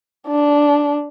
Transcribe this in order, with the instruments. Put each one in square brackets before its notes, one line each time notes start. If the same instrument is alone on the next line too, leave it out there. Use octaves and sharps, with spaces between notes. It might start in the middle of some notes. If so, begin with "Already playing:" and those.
[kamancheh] D4